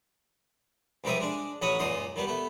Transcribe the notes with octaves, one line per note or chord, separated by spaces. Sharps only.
C#2 F3 G3 A#4 E5 D#6
G#3 D4
A1 F#3 C#5 B5 D#6
C#2 F#2 A#2 D#4 C6 D#6
D#3 G3 B3
A3 B3